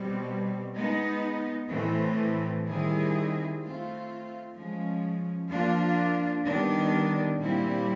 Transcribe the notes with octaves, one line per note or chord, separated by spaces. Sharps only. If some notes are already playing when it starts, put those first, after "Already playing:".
Already playing: B2 G3 C4
G#3 B3 D#4
A2 E3 A3 C4
D#3 G3 C4 E4 G#4
A3 C4 F4
F3 G#3 C#4
F3 A#3 D4 F4
D#3 G3 B3 D4
A#2 G3 C4 E4